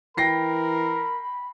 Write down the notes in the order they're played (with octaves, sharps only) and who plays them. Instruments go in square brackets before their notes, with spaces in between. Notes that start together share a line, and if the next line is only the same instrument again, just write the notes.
[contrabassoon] E3 [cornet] A#4 [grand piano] G5 A#6 C7 [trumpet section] B5